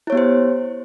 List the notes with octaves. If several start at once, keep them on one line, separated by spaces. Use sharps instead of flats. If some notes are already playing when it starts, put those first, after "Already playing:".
B3 E4 G4 C5 C#5